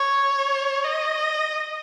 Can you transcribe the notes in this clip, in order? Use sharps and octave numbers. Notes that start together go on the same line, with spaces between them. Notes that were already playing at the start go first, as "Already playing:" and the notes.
Already playing: C#5
D#5